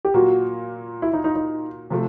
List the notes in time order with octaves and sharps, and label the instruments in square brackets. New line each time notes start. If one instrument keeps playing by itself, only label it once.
[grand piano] G4
[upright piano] A#2 F#3 A#3 [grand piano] F#4
[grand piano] E4
D#4
D#4
D#4
[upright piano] C3 F3 A3